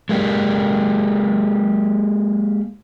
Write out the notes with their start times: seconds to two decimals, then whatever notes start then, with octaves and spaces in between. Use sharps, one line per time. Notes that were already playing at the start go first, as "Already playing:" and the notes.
0.09 G#3 A#3 G4